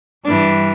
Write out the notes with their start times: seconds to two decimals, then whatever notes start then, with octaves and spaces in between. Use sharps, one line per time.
0.24 G2 E3 D4